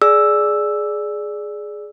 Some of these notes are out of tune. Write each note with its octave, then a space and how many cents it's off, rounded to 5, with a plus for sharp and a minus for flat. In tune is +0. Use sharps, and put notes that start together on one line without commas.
G#4 +10 D5 +0 E6 +0